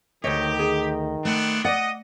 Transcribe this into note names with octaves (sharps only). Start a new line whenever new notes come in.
D2 D#3 G4 C#5 D#5
G#4
A3 B3 C4 D4
D5 D#5 F#5